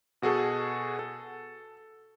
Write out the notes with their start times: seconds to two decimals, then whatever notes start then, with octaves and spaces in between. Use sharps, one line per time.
0.22 B2 F#4 G#4 A4
0.99 A4